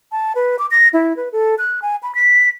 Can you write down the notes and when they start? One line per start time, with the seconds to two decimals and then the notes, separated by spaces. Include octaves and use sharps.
0.12 A5
0.35 B4
0.59 D6
0.71 A#6
0.93 E4
1.17 B4
1.32 A4
1.58 F#6
1.82 G#5
2.03 B5
2.15 B6